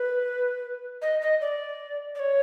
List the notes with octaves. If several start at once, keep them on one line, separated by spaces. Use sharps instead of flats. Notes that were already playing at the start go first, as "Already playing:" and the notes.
Already playing: B4
D#5
D#5
D5
D5
C#5